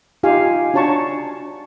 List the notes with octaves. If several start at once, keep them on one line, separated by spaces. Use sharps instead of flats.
D#4 F4 G4 F5 G#5
D4 F#4 C#5 A5 A#5 C#6